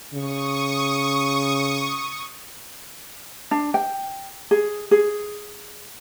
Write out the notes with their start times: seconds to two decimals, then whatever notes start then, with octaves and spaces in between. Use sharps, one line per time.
0.14 C#3 C#6 D#6
3.51 D4
3.74 G5
4.51 G#4
4.91 G#4